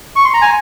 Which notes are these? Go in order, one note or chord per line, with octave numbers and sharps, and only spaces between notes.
C#6
C6
A#5
G#5